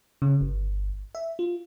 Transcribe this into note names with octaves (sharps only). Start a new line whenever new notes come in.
C#3
G1
E5
F4